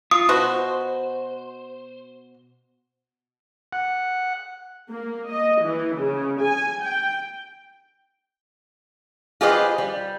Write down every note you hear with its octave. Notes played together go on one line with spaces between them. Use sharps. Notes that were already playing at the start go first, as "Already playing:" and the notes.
F4 D#6
B2 F#4 C5
F#5
A#3
D#5
E3
C#3
G#5
G5
F4 G4 G#4 B4 C5 D#5
G3